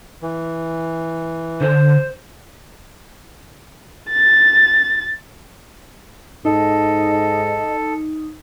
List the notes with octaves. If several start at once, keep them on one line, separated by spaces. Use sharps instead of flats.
E3
D3 C5
A6
G#2 D#4 A4 D#5